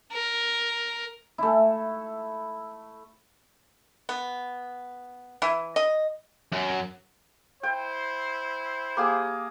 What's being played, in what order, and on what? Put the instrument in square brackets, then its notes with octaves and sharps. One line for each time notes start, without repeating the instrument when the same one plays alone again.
[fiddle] A#4
[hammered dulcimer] A3 E4
[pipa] B3
E3 E4
D#5
[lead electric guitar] F#2
[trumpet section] E4 C5 [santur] G5
[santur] A#3 G4 G#4